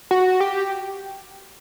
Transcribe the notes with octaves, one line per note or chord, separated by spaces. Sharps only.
F#4
G4